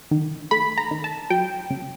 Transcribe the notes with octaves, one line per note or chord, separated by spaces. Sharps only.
D#3
A3 B5
A#5
D#3
A5
F#3 G5
C#3